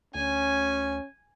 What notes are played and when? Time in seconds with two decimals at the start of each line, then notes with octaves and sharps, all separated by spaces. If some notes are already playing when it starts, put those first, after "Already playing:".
0.15 D2 C#4 G#5